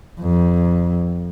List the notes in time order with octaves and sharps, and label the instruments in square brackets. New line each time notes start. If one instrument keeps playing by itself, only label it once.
[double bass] F2